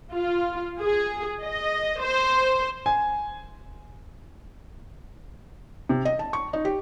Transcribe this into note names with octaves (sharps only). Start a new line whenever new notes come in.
F4
G#4
D#5
C5
G#5
C3
D#5
A5
C#6
D#4
G4